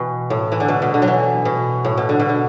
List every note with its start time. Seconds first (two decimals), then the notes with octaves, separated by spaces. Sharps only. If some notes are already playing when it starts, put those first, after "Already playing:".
Already playing: B2 E3
0.30 A2
0.52 E3
0.60 D3
0.68 B2
0.82 B2
0.94 D3
1.02 F#3
1.08 E3
1.45 B2
1.85 A2
1.97 B2
2.09 D3
2.20 B2
2.29 D3